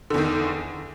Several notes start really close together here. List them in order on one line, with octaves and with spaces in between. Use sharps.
D3 E2 D#3